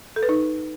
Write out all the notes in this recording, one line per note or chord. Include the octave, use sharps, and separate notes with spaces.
A4
B4
D#4